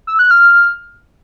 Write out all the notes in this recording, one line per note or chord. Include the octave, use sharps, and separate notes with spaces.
E6
F#6
F6